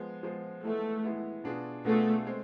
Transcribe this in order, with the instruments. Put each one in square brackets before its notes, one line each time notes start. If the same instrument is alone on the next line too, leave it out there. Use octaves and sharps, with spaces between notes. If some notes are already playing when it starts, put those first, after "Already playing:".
Already playing: [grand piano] F3 G#3 B3
F3 G#3 B3
[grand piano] E3 G#3 B3 E4 [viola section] A3
[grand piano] E3 G#3 B3 E4
B2 B3 D4 F4 G#4
[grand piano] B2 B3 D4 F4 G#4 [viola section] A3
[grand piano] G#3 C4